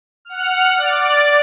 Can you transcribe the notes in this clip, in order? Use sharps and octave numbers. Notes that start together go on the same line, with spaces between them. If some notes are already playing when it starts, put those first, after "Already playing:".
F#5 F6
D5